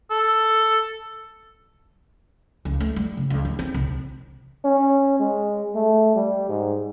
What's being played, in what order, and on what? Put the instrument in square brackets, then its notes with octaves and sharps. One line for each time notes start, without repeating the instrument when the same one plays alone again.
[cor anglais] A4
[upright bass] C#2
A3
G3
C#3
C#2
D#3
C4
C2
[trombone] C#4
G#3
A3
G3
G#2